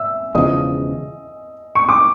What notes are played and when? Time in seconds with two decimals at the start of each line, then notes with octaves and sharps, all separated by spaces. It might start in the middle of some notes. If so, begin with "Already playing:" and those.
Already playing: E5 E6
0.35 E1 E2 C#3 F3 D#5 D#6
1.75 C#6
1.89 D6